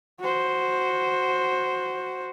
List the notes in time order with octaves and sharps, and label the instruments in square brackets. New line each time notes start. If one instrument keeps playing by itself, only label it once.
[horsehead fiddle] F#4 C5